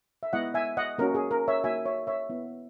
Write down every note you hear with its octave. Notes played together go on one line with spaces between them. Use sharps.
E5
G#3 B3 E4 D#5 F#5
E5 G#5
D#5 F#5
A#3 C#4 F#4 A#4
G#4
A#4
C#5 E5
A#3 D#4 F#4 E5 G#5
C#5 E5
C#5 E5
B3 E4